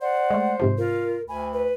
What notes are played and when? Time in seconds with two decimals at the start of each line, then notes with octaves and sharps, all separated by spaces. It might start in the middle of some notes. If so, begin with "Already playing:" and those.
0.01 C5 D5 F#5
0.31 G#3 A3
0.60 G#2 C3 F3
0.78 F4 A#4
1.28 D2 G#5 B5
1.52 B4